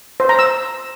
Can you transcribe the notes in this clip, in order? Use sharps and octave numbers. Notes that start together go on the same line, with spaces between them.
C5
A#5
E6